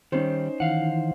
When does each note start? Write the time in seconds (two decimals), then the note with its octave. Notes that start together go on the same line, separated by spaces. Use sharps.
0.12 D#3 G3 C#4 D#4 C5
0.60 D#3 E3 F5 F#5